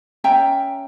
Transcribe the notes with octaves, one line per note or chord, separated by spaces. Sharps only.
C#4 E5 G5 A#5